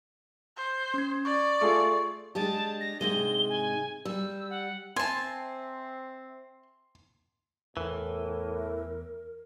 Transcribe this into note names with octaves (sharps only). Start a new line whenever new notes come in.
C5
C#4 G#6
D5 C#6
A3 F4 G#4 C#6
G#3 D4 G4 A5
A#6
G#2 C3 G#3 G7
G#5
G3 E6
F#5
C4 E5 G#5 A5 C6
E2 A2 E3 A#4